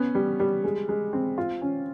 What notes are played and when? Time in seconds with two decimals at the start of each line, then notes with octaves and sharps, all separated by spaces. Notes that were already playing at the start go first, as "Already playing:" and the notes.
Already playing: B3 C#4
0.15 G3
0.40 G3
0.64 G#3
0.89 G#3
1.13 C4
1.38 F4
1.62 C#4